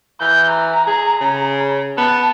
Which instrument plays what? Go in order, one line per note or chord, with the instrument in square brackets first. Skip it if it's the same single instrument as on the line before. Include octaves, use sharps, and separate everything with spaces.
[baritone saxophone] E3 [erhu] G6
[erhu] A#5
[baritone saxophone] G#4
C#3
[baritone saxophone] B3 [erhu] A5